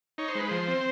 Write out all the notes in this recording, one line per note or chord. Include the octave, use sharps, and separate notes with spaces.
D#4 C#5
C5
G#3 B4
F3 C5
C4